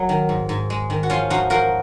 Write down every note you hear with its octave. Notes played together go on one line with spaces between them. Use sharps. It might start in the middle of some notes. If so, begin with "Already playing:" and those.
Already playing: F#3 A#3
D#3
G#2
G#2
G#3
D#3
F#4
F3 C#4 F4
F3 D#4 F#4
F3 F#4 A#4